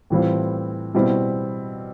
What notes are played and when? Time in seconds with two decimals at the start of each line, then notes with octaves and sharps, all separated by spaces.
0.10 A2 E3 G3 C4 F4
0.94 B2 G3 C4 E4